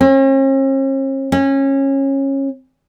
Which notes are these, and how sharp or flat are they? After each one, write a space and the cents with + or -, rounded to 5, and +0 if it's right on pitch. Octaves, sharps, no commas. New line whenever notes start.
C#4 -45
C#4 -25